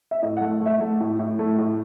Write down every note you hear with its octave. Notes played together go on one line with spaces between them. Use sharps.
E5
A2 D#5
A3 F#5
A3 E5
A3
A2
A2
A3
A2